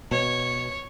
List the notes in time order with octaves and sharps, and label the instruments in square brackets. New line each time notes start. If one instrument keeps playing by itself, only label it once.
[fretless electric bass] B2 [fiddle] C#5